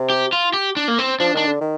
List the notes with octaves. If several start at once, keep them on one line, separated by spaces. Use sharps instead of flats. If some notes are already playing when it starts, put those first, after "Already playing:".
Already playing: C3
G4
F4
G4
D4
A#3
C4
F3 D4
D#3 D4
D3
D#3